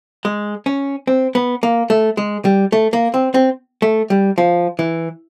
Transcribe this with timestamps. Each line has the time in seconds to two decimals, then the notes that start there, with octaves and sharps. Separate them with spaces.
0.25 G#3
0.66 C#4
1.07 C4
1.35 B3
1.63 A#3
1.90 A3
2.17 G#3
2.45 G3
2.72 A3
2.93 A#3
3.14 C4
3.34 C4
3.82 A3
4.10 G3
4.38 F3
4.79 E3